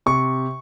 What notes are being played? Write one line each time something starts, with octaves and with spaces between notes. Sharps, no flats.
C3 C#6